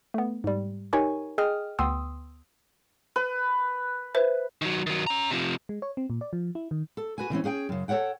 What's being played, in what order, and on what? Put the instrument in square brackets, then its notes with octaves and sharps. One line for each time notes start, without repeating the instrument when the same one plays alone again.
[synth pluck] A3 B3
G#2 G3
D#4 G4 A#4 C#5 G#5 C#6
G#4 D#5 G5 D#6 F6
D2 B3 G5 C6 D#6 E6
[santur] B4
[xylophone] B4 C5 E5
[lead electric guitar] D#3 F#3
D#3 F#3
C#4 A#5
C3 F3
[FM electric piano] G#3
C#5
C4
A#2
D5
F3
E4
D#3
[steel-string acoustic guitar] A4
F#4 B4 G#5
D3 E3 C4 C#4
C#4 G#4 F#5 G5
F#2 C#3
A4 A#4 C#5 F#5 G5